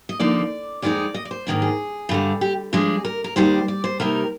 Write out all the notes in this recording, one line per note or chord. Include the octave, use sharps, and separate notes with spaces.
D#5
D#2 D3 F3 A#3 D#4 D5
F2 D#3 G#3 D#4 D5
D#5
D5
C5
G#2 D#3 A#3 D4
G#4
G2 D3 G3
G4
G2 F3 G#3 D4 G#4
A#4
A#4
D#2 D#3 G3 C5
D5
C5
C3 G3 A#3 D#4 A#4